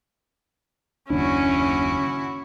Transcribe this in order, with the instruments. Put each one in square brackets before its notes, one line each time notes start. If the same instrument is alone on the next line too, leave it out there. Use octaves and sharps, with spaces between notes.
[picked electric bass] F#1 D#2 D4 [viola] C#4 [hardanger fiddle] E4 F#4